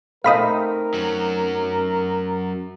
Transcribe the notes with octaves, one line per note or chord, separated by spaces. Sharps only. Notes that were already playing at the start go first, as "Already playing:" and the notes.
A3 C4 D#4 A#4 F5 B5 D#6
F#2 F#3